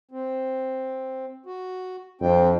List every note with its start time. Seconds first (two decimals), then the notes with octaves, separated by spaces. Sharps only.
0.11 C4
1.46 F#4
2.21 F2 C4 D4 G5